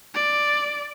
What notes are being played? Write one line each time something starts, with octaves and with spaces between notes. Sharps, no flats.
D5